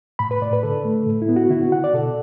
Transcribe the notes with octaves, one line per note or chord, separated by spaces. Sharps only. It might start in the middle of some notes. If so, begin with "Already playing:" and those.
A2 B5
B4
A2 D5
B4
D3 A4
A3
A2
E4
B3
F#4
D3 E4
F#4
D3 F#5
D5
B2 A4